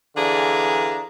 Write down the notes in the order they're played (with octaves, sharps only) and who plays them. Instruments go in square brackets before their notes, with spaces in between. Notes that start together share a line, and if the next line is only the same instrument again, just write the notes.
[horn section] D3 E3 D4 G#4 F5 A#5